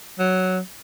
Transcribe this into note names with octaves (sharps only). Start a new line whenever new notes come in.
F#3